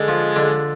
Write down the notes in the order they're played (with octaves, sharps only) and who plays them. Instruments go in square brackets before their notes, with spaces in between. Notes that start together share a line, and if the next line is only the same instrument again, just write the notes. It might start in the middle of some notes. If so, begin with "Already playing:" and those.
Already playing: [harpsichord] D3 [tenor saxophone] G#3
[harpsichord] F3
D3